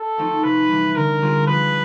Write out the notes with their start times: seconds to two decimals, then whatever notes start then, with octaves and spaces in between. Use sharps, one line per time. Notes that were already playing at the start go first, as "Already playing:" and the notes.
Already playing: A4
0.18 F3 A3 C4 D#4
0.43 C3 B4
0.69 E3 G3
0.95 D3 A#4
1.22 G3 C4 F4 G#4
1.47 F3 B4